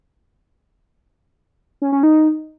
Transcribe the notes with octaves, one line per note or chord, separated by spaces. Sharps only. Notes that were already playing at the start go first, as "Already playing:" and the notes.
C#4
C#4
D#4